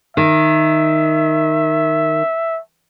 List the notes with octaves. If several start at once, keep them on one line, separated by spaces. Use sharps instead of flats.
D#3 E5